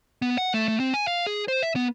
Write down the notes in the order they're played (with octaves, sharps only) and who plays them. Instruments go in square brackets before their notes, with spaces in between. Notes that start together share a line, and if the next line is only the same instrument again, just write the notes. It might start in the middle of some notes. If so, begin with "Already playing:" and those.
[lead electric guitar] B3
F#5
A3
A3
C4
G#5
F5
G#4
C5
E5
B3